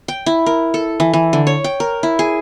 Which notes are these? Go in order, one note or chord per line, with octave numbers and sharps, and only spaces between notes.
G5
E4
A#4
A4
E3
E3
D3
C#5
G5
A#4
E4
G#4